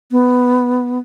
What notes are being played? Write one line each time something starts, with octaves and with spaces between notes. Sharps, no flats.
B3